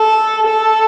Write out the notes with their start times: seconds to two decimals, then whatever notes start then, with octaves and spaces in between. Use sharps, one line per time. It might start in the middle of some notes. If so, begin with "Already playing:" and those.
Already playing: A4
0.46 A4